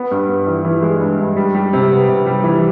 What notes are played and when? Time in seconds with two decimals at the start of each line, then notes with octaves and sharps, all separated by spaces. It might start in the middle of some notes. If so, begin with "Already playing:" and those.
Already playing: B3
0.11 G2
0.29 B3
0.47 E3
0.64 E3
0.82 G#3
1.01 G2
1.19 G2
1.37 G3
1.55 G3
1.73 C3
1.91 B3
2.08 C3
2.26 G3
2.44 E3